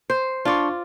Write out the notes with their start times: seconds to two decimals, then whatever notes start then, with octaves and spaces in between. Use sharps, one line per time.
0.10 C5
0.45 D4 F4 D5 C6 C#6